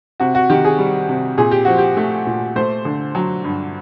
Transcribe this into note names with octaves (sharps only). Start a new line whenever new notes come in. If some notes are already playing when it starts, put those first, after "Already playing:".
C3 F#4
F#4
D#3 G4
G#4
G3
C3
A#2 G#4
G4
F3 F#4
G4
A3
A#2
A3 C5
D3
F#3
G2